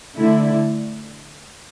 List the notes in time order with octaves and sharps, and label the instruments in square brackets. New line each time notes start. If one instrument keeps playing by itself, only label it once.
[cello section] D3 A3 E4